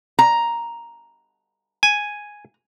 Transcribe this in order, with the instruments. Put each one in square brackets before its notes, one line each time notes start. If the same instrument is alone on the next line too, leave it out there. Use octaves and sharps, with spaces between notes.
[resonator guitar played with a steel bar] A#5
[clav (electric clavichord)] G#5